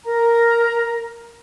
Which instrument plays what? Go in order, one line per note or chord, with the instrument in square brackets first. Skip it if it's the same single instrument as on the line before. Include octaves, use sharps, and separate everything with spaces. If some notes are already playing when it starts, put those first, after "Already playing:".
[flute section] A#4 A#5